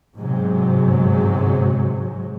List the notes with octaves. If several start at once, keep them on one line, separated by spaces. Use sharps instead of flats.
G1 G#2 C3 F#3 G#3